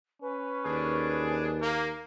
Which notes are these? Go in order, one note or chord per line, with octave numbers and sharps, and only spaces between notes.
C#4 B4
D#2 D4 G#4
A#3